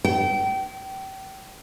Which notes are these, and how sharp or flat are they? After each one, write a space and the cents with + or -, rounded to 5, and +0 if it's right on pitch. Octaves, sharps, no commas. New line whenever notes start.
G5 -30